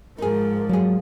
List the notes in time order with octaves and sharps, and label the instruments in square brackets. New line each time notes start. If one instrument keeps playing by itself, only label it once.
[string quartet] G#2 F3 [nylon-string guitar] D#4 G#4 [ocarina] A#4
[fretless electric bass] F#3 [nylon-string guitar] A#3 G#4